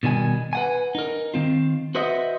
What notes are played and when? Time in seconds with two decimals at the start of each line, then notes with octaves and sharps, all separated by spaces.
0.03 B2 D#3 G3 G#5
0.53 B4 F#5 G#5
0.95 D#4 A#4
1.34 D#3 C4 F4
1.95 F#4 B4 C5 D#5 E5 F#5